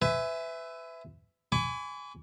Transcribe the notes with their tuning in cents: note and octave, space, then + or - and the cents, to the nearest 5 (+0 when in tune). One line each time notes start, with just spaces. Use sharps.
B4 +30 E5 +0 G#5 +0
G#5 +0 B5 +30 D6 -45